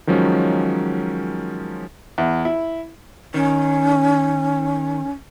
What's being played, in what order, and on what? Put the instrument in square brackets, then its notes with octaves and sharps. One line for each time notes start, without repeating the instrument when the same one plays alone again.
[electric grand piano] D#3 F3 F#3 G#3 C#4
[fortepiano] E2
E4
[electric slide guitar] D#3 [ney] C#4